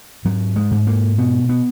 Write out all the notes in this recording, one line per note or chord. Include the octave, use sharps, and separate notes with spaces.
G#2 F#3
G#3
G#2
A#3
B2 B3
B3